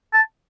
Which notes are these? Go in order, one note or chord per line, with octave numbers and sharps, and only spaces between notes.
A5